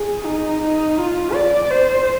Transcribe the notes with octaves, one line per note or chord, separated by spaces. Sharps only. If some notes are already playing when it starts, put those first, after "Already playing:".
Already playing: G#4
D#4
D#4
F4
D5
C5